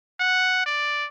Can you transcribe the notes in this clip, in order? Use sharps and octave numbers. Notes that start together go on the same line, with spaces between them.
F#5
D5